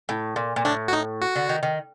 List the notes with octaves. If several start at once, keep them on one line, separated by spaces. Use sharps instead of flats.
A2
A#2
A#2
A2 D4
F#4
D#4
F#4
D3
D#3
D#3